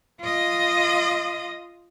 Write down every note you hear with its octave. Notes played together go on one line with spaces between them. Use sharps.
F4 D#5